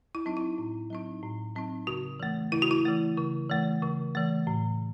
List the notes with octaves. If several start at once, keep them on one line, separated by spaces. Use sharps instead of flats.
E4
F#3 C4 D#4
E4
A2
F#3 C4 D#4
A2
F#3 C4 D#4
C#3 F#4
E3 A3
C#3 E4
F#4
E4
E3 A3
C#3
E3 A3
C#3
E3 A3
A2